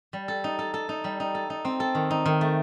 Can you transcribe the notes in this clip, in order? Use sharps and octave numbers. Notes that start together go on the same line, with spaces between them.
G3
A4
D#4
A4
A4
D#4
G3
D#4
A4
D#4
C4
A4
D#3
D#4
D#3
A3